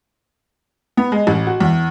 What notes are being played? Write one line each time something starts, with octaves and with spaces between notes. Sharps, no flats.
B3
G#3
A1
F#4
E2